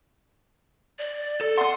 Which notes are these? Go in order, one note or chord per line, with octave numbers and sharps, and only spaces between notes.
D5
A4
F#5 C6 D#6